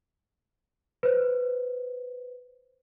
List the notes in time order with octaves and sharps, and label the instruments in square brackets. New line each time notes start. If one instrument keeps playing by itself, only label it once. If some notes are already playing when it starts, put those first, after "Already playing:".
[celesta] B4 C5